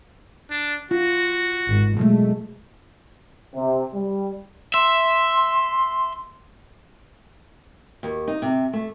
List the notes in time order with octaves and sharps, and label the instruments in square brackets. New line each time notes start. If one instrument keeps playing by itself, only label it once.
[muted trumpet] D4
[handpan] F4 [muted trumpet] F#4
[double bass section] G#1
[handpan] B2 F#3 G#3 [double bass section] A3
[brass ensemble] C3
G3
[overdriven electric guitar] E5 [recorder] C6
[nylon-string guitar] D#2
D#4
C3
A3